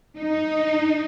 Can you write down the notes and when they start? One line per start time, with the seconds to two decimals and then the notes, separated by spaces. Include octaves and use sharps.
0.18 D#4